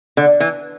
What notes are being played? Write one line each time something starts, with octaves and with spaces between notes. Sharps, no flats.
D3
E3